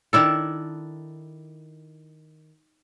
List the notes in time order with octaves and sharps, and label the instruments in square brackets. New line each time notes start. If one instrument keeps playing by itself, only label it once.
[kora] D#3 D4 E4 A4